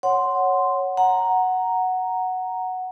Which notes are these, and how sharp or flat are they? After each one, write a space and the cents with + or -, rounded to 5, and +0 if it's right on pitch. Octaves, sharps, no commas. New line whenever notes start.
C#5 +0 F#5 +0 C6 +0
F#5 +0 A#5 +0